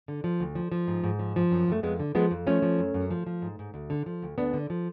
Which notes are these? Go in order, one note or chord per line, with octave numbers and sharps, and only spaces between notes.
D3
F3
D2
F3
F3
G#2
G#2
F3
F3
F#2
F#2 A3
F2 G#3 B3
D3
F3 G#3 B3
F2
F3 A3 C#4
F3
F#2
F#2
F3
F3
G#2
G#2
D2
D3
F3
D2
D2 B3 D4
D3
F3